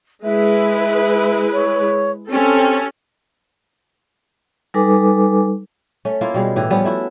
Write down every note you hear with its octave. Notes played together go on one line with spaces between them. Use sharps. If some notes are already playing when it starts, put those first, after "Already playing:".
G#3 E4 B4 E5
C#5
C4 C#4 G4 A4
G3 D#4 A4 B4 G#5 D6
A3 C#4
A#3 E4 F4
B2 G3 G#3
A2 E3 G4
F3 G3 B3 C#4
A3 E4 F#4